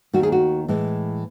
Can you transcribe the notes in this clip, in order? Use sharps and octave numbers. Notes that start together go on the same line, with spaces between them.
D#2 D#3 A3 F#4
G#4
F#4
A2 E3 G#3